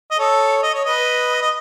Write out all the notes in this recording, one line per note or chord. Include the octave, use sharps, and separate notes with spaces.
D#5
A4 C#5
D#5
C#5
B4 D#5
D#5